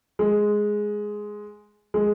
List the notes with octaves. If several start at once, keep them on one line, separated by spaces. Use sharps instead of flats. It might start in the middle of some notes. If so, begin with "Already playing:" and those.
G#3
G#3